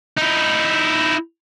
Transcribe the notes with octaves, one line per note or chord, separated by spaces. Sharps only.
D#4 E4